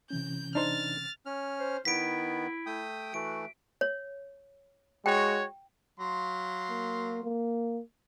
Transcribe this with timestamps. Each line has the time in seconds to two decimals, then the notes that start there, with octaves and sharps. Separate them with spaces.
0.10 C3 E3 C#4 G6
0.55 D4 D#4 C5 F6 A6
1.26 C#4 F6
1.60 C5
1.85 D#3 B3 E4 B6 D7
2.66 A3 G5 D#6
3.14 E3 A3 F#4 D7
3.81 C#5
5.06 G#3 F#4 C#5 G5
6.00 F#3 F5 C6
6.69 A#3
7.24 A#3